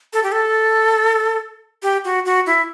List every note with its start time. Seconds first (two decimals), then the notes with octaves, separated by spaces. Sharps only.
0.13 A4
0.23 G4
0.32 A4
1.83 G4
2.05 F#4
2.25 F#4
2.46 E4